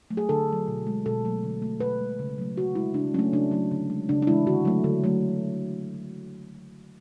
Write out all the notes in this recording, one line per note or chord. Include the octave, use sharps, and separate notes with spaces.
F#3 A3
G#4
D3 A4
F#3 A3
B2
G#3
B2 A4
F#3 A3
D3
A3
B2 B4
G#3
C#3
F#3 A3
D3 F#4
G#3 E4
C#3 D4
F#3 A3 C#4
C#3 D4
F#3 A3
D3
G#3
C#3 D4
D4
E3 G#3 E4
D3 F#4
F#3 A3
D3
F#3 A3